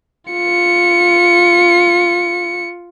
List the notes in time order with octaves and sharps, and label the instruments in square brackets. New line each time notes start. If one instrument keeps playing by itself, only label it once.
[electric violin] F4 C#7